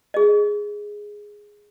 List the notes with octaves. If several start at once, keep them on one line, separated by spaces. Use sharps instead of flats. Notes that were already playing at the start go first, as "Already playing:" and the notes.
G#4 D#5